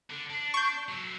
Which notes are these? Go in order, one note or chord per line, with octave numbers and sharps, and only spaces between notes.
D3
D4
C#6 G6
F#3 A4